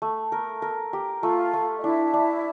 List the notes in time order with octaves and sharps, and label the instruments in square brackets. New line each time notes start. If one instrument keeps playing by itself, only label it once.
[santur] A3
A#4
A#4
G4
[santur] A3 [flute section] F4 F5
[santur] A3
[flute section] D#5
[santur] D4 [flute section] E4 E5
[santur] D4